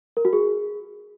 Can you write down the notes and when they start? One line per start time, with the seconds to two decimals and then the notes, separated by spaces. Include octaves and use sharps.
0.17 A#4
0.25 F#4
0.33 G#4